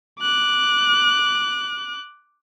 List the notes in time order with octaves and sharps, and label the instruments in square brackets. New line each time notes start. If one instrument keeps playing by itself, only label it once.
[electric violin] D6 F#6